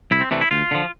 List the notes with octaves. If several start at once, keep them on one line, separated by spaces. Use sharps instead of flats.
C2 E4
C4
C3 E3 A3 D4
E4
D2 F4
D3 F3